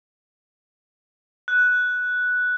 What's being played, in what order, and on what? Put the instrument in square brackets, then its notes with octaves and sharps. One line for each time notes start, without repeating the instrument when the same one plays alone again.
[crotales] F#6